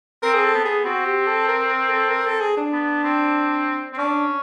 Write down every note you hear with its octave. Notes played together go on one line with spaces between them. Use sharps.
C4 A#4
G#4
A4
B3
G#4
C4 F#4
G4
A4
A#4
A#4
A4
A#4
A4
G#4
D4
B3
C4
C4
C#4 D4